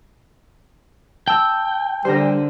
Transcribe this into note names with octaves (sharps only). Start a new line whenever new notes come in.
G5 A5 E6
D3 G3 A#4 C5